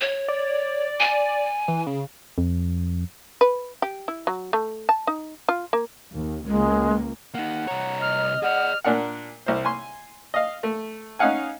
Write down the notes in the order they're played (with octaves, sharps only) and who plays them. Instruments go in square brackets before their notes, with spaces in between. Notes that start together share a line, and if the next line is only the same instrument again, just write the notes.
[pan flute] C#5
[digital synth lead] D5
[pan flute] G#5
[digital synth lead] E3
C#3
[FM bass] F2
[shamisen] B4
G4
E4
F#3
A3
A5
D#4
F4
A#3
[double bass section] D#2
[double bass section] C#2 A#3 [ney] G#3
[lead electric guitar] A#3 D#4 [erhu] F#5
[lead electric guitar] C2 C#5 [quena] A#5
[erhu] D#5 [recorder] F6
[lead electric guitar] G#4 D5 [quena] F#5 [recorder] F6
[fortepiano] A#2 D4 A#4 F#5
C2 C5
G#5 C6
D#5 F5
A3
C#4 D#4 F5 F#5 G#5